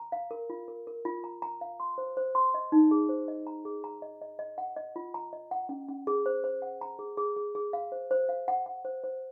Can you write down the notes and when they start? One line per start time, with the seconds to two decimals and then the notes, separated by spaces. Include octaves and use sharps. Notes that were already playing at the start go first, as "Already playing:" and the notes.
Already playing: A#5
0.12 F5
0.31 A#4
0.50 F4
0.68 A#4
0.87 A#4
1.05 F4
1.24 A#5
1.42 A#5
1.61 F5
1.80 C6
1.98 C5
2.17 C5
2.35 C6
2.54 D#5
2.72 D#4
2.91 G#4
3.09 C5
3.28 D#5
3.47 A#5
3.65 G#4
3.84 A#5
4.02 D#5
4.21 D#5
4.39 D#5
4.58 F#5
4.77 D#5
4.96 F4
5.14 A#5
5.33 D#5
5.51 F#5
5.69 C#4
5.89 C#4
6.07 G#4
6.26 C5
6.44 C5
6.62 F#5
6.81 A#5
6.99 G#4
7.17 G#4
7.36 G#4
7.55 G#4
7.73 F5
7.92 C5
8.11 C5
8.29 F5
8.48 F#5
8.66 F#5
8.85 C5
9.04 C5